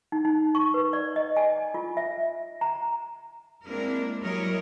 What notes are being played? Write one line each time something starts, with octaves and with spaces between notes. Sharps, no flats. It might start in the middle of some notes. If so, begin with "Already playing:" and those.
D#4
D#4
C#6
B4
D5
D#5
G#5
F4
E5
A#5
G#3 A#3 C4 D4 E4 A#4
F#3 G3 E4 A#4 C#5 D#5